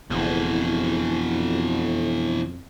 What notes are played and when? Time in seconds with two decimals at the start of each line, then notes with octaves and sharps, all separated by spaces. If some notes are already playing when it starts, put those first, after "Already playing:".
0.10 F#1 F2 B2 E3